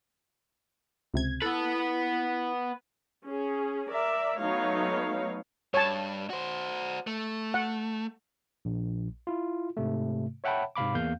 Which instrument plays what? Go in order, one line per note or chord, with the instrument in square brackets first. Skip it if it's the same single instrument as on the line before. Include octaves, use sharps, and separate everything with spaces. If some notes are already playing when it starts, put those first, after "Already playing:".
[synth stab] C#2 C3 G#6
[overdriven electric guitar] B3 B4 [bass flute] E4 [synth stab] A4
[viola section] C#4 G#4
A#4 D5 E5
F#3 A3 B3 D#4 C#5 F5
[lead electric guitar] G2 [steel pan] C#5 A5
[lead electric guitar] F#4 C5
A3
[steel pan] F#5
[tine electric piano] A#1
E4 F4
G#2 C3 A3
C#5 E5 F#5 G5 A5 B5
G#2 C3 F5 B5 D6
E2 A#3 F5 G6